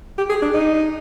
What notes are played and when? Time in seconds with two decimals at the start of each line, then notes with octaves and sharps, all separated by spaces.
0.18 G4
0.30 G#4
0.42 D4
0.54 D#4